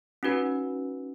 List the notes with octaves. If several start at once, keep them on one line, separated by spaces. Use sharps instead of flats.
C#4 D#4 F#4 B4